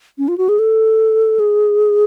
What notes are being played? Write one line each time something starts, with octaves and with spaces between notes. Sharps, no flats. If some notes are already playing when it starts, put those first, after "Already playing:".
C#4
F4
F#4
G#4
A4
G#4